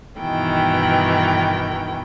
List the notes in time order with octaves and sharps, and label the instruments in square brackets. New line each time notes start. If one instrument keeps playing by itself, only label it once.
[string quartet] G2 B2 D#3 E3 G5